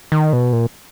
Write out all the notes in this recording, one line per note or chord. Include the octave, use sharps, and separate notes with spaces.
D#3
B2
A#2